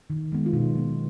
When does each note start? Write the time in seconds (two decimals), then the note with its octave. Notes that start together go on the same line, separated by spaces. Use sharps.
0.10 D#3
0.32 G#3 B3
0.46 F4
0.53 B2 D#4
0.75 F#3 B3